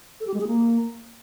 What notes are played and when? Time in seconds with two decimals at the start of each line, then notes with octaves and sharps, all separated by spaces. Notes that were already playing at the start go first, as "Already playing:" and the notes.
0.20 A4
0.27 G4
0.34 G#3
0.40 G#4
0.47 A#3